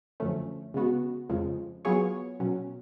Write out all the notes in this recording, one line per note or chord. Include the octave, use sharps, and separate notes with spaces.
F#2 D3 F3 A3 C#4
C#3 G#3 B3 F#4
F2 C#3 F3 G#3
F#3 B3 F4 G#4 C#5
B2 F#3 C#4